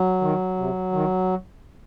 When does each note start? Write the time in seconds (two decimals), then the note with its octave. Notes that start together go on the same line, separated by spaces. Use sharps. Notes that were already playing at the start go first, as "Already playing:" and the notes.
Already playing: F#3
0.21 D#3
0.57 C3
0.92 D#3